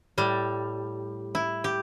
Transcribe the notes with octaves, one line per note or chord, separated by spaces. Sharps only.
A2 G3
E4
G4